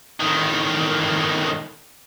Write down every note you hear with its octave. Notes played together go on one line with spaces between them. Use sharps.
A2 D#3